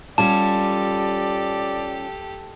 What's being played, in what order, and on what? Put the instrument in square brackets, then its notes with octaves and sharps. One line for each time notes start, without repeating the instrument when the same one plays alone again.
[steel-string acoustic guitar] G3 C#4 F4 [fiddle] G4 A4 [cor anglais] D5 [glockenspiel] A5